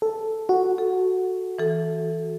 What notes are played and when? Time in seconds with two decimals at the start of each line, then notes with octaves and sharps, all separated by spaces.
0.02 A4
0.49 F#4
0.78 A4
1.59 E3 A4